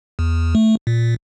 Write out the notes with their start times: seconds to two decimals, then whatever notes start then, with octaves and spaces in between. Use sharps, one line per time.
0.19 E2
0.55 A3
0.87 A#2